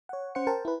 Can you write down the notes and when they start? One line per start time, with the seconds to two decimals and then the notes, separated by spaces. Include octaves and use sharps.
0.09 C#5 F#5
0.35 C#4 C5 F#5 C#7
0.47 A#4 C5 G5 A5
0.65 E4 B4